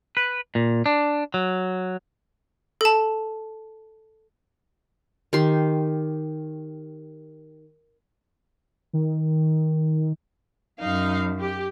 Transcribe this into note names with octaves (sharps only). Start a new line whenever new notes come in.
B4
A#2
D4
F#3
A4 A5
D#3 G4 C6
D#3
F#2 D#4 F5
G4